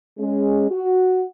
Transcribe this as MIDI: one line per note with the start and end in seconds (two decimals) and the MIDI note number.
0.19 0.70 56
0.19 0.70 61
0.71 1.24 66